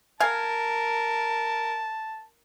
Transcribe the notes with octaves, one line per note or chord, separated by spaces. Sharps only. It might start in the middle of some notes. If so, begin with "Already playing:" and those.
A#4 F5 G#5 A5